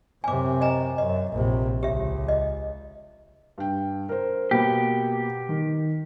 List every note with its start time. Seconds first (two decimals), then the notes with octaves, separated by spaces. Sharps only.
0.24 F#2 C3 G#5 D6
0.61 D#5 G#5 A#5
0.98 F#2 D#5
1.34 A#1 C3
1.83 C#2 G4 E5
2.28 D#5
3.58 G2 G5
4.09 A#4 C5
4.51 B2 A#3 B3 G4
5.49 D#3